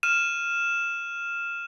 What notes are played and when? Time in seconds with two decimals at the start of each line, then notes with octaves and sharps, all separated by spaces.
0.03 F6 D#7 E7